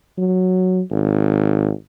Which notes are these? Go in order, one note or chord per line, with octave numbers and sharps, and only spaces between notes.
F#3
G#1